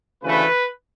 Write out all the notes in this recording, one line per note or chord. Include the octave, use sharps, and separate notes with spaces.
D2 C#3 E3 A3 B4